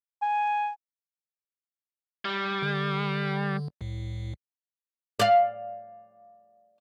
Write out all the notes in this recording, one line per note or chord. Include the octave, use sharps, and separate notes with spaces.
G#5
G3
D3
C2 A2
D5 F5